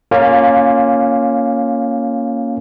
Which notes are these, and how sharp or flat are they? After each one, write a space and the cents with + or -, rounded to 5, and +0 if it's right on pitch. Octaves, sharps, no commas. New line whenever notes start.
A#3 +0 C#4 +0 F4 +25